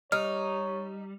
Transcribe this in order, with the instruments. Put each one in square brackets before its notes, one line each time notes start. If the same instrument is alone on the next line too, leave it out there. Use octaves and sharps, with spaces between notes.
[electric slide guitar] G3 [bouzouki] D#4 [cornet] C#5 [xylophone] F6